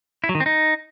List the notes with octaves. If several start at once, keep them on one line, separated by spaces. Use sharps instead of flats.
E4
F#3
D#3
C4
D#4